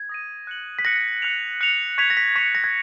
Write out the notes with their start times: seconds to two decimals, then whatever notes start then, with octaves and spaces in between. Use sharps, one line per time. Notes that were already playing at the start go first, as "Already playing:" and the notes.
Already playing: G#6
0.09 D#6 A#6 D#7
0.47 F#6 C#7 F#7
0.79 B6
0.85 F#6 A#6 C#7 F#7
1.22 F#6 C#7 F7
1.61 F#6 C#7 F7
1.98 C#6 G#6 B6 C#7 F7
2.10 A#6
2.17 B6
2.35 C#6 G#6 B6 C#7 F7
2.55 A#6
2.64 G#6